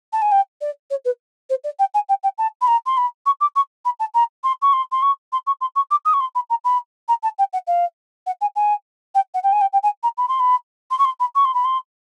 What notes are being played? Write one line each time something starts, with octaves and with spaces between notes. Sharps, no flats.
A5
G#5
G5
D5
C#5
B4
C5
D5
G5
G#5
G5
G5
A5
B5
A#5
C6
B5
C#6
D6
C#6
B5
A5
A#5
C6
C#6
C6
C6
C#6
C6
C#6
C6
C#6
D6
D#6
C#6
C6
B5
A#5
B5
A#5
A5
G5
F#5
F5
F#5
G#5
G#5
G5
F#5
G5
G#5
G5
G5
G#5
A#5
B5
C6
B5
C6
C#6
C6
B5
C#6
C6
B5
C6